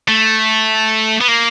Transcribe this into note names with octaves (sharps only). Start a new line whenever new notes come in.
A3
B3
A#3